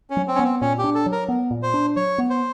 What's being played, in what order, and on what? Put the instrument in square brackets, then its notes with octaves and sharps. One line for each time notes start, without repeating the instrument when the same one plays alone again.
[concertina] C#4
[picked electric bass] F#3
[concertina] C4
C#4
[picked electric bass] B3
[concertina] C4
[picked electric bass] A#2 [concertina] C#4
[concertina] G4
[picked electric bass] D4
[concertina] A4
[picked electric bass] F#3
[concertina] A#4
[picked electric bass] B3
A#2
[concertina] C5
[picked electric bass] D4
[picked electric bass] F#3 [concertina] C#5
[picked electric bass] B3
[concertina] C5